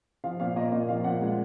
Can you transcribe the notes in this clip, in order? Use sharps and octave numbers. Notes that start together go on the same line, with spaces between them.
F3 F5
A#2 F5
A#3 D#5
A#2 D#5
F3 F5
A#2 F#5
G#3